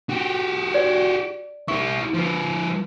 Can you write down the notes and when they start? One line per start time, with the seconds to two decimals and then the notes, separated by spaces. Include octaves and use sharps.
0.10 F#4 G4
0.74 D5
1.68 E4 G4 C#6
2.14 F3 B4